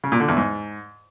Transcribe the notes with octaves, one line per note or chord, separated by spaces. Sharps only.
C#3
A#2
D3
E2
G#2